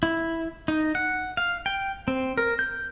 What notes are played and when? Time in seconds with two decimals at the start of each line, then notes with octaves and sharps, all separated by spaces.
0.03 E4
0.68 D#4
0.95 F#5
1.37 F5
1.66 G5
2.08 C4
2.37 A#4
2.59 G6